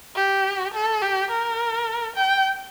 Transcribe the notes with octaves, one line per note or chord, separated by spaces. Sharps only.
G4
A4
G4
A#4
G5